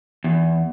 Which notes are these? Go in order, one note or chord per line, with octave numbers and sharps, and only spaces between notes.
E2